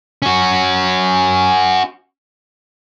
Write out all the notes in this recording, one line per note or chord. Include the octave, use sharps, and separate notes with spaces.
C#4 F#4